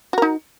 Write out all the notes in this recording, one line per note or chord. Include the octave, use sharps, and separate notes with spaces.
D#4 F#4 A#4